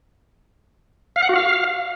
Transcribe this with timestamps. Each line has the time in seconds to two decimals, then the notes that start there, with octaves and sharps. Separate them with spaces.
1.16 F5
1.23 F#5
1.29 F#4
1.36 F5